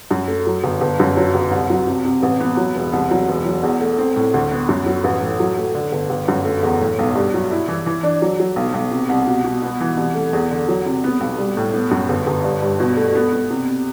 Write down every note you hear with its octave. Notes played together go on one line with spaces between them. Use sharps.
F#2
A3
F#3
G1
G1
F#2
F#3
G1
C2
F#3
C3
C3
A1
B3
F#3
E1
C2
F#3
E1
F#3
E2
A3
C4
A2
D2
B3
F#2
F#3
A1
A2
F#3
A3
D3
G1
G1
F#2
A3
E2
A2
B1
G2
F#3
E4
E3
E3
D4
F#3
F#3
B1
B1
C3
C2
B2
B2
B3
E3
C2
A3
E2
D3
F#3
C3
B3
B1
G3
A2
B3
F#2
G1
G1
G2
G2
B2
A3
B3
B3
C3